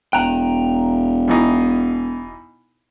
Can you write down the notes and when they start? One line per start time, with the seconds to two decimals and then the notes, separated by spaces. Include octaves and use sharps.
0.13 E1 G5 A#5 F#6
1.28 B2 E3 D#4